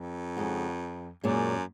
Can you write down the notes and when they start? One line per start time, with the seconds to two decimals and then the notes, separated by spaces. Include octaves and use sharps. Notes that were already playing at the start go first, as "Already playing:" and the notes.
Already playing: F2
0.37 C#3 G#3 D#4 F#4
1.24 F#2 A#2 G#3 C#4